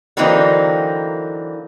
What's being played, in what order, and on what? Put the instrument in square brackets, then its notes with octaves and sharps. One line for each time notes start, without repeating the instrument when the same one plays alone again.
[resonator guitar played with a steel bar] D3 E3 F#3 A#3 C4 D#4